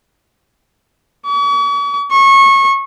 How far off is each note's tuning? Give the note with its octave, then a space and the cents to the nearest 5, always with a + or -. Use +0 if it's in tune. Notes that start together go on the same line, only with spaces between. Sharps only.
C#6 +45
C#6 -25